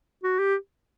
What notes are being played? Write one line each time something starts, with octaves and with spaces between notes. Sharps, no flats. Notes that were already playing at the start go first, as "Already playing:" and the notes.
F#4
G4